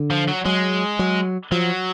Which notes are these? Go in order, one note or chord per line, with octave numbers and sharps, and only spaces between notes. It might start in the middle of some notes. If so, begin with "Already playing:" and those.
Already playing: D3
F3
F#3
F#3 G#3
F#3
F3 F#3